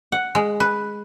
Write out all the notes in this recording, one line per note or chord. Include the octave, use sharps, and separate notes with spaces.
F#5
G#3
B4